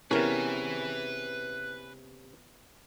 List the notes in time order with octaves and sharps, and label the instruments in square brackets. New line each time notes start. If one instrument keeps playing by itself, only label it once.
[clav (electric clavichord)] C3 C#4 [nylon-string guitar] B3 E4 [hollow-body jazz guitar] G#4 A#4 [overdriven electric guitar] B4 G#5